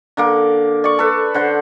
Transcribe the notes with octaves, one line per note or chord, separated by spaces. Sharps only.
D3 A#3 D6
D5 C#6
A4 B4
D3 C5 F#5